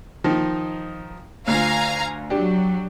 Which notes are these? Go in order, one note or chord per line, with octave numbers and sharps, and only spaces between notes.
D#3 F3 D#4
D2 F4 F5 G#5 A#5
F#3 D4 G4